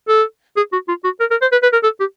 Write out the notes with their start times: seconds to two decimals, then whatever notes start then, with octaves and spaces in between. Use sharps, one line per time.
0.08 A4
0.56 G#4
0.72 F#4
0.88 F4
1.04 F#4
1.20 A#4
1.30 A#4
1.41 C5
1.52 B4
1.62 B4
1.73 A#4
1.83 A4
2.00 G4